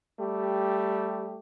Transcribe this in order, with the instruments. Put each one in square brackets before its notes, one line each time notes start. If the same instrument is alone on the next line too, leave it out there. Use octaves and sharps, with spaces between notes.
[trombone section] G3 A3 G4